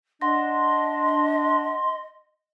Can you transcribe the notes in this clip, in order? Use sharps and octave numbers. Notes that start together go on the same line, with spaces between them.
D4 D#5 F#5 C6 A#6